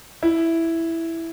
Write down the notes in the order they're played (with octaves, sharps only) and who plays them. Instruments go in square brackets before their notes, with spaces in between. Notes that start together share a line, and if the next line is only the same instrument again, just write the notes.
[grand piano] E4